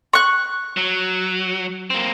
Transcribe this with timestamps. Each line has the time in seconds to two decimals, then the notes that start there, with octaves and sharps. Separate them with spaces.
0.13 C#6 F#6
0.77 F#3
1.90 A#3 C4